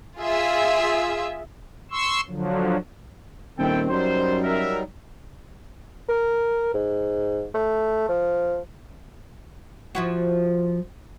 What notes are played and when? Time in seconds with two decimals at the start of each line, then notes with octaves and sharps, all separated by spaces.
0.19 F4 G#4 E5
1.91 C6 C#6 E6
2.28 D3 F3 F#3
3.58 D#1 D#3 C4 E4 A4 G5
3.89 F#2 F#3 G3 D#4 C5
4.44 A#4 E5
6.09 A#4
6.74 G#2
7.54 A3
8.09 F3
9.95 F3 E4 F#4